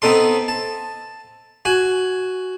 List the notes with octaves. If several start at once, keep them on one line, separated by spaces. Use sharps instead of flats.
B3 C4 D#4 A4 C6
A5
F#4 G#5